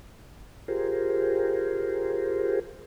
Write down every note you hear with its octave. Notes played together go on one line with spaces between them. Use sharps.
F4 G4 G#4 A#4 C5